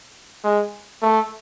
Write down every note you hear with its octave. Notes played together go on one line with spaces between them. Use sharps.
G#3
A3